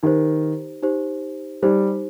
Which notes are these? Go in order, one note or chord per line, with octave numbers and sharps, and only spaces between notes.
D#3 D#4 G4 C5
D#4 G4 C5
G3 D#4 G4 C5